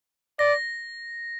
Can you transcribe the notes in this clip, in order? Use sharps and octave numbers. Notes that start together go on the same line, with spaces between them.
D5 A#6